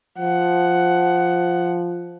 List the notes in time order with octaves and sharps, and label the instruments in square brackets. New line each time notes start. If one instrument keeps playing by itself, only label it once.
[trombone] F3 [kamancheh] F#5